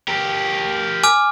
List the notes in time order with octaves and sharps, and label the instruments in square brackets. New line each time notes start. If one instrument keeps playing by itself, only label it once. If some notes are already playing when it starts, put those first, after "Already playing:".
[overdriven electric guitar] G4 A#4
[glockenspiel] G#5 D6 F6